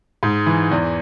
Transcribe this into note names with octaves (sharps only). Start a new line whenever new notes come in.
G#2
E3
E2